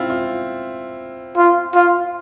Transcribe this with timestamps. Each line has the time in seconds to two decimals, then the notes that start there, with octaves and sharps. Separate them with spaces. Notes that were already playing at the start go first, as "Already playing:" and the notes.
Already playing: C4 E4 F4
0.10 F4
1.37 F4
1.74 F4